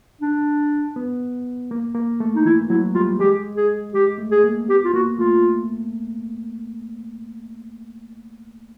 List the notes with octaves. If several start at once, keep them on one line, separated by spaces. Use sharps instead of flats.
D4
B3
A#3
A#3
A3
D#4
E3 E4
F#3 E4
G3 F4
G#3 G4
G#4
G#3 G4
A3
G#4
A#3
B3 G4
F4
A#3 F#4
A3 F4